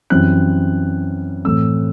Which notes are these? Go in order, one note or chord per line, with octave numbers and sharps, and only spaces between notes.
F#2 E3 G3 C4 F#6
A2 E3 A3 C4 E6